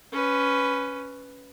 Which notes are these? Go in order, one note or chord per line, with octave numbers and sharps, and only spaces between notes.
C#4 B4